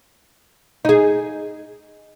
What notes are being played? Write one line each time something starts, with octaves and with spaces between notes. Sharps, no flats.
D#4 G#4